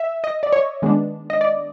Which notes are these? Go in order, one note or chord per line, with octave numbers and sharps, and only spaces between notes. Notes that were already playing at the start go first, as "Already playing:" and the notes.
Already playing: E5
D#5
D5
C#5
D#3 G#3 B3 D4
D#5
D5